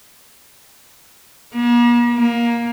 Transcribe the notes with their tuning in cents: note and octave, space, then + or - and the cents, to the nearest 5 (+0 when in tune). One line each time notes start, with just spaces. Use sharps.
A#3 +45
A#3 +15